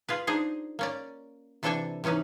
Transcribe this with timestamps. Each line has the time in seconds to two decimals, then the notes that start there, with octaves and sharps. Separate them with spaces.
0.09 F4 G#4 B4
0.27 D4 D#4 G#4 C5
0.79 A#3 C#4 D5
1.63 C3 E3 D4 A4 G5 G#5
2.04 C3 E3 C#4 D#4 B4